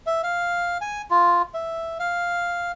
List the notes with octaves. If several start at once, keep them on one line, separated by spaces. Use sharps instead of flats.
E5
F5
G#5
F4
E5
F5